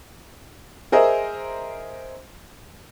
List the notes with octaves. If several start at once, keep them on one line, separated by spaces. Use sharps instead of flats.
G#4 A#4 C5 D#5 E5